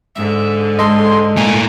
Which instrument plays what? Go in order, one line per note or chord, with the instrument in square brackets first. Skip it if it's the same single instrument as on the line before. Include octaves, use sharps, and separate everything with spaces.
[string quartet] G#2 D3 [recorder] E5
[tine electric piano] G#3 A4 D#5 [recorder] C6
[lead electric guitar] A2 A#3 [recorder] G#5